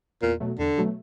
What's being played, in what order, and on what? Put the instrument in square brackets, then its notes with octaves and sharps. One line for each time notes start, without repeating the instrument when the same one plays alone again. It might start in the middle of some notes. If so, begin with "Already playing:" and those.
[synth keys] E2 [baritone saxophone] A#2
[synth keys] B2 F#3 A3
[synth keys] E2 [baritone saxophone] D3
[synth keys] B2 F#3 A3